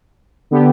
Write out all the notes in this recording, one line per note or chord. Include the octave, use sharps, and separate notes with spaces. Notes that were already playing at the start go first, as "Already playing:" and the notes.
D3 B3 G4